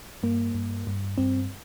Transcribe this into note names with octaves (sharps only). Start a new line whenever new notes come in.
G2 A#3
G2
G2
G2 C4